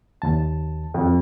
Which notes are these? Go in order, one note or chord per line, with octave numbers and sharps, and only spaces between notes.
D#2 A5
F2